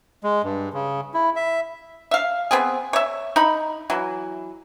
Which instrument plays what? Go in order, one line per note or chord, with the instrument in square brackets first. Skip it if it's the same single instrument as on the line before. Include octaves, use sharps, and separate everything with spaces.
[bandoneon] G#3
G2
C#3
E4
E5
[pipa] E5 F5
B3 C4 G#4
C#5 E5
D#4 B5
E3 F#3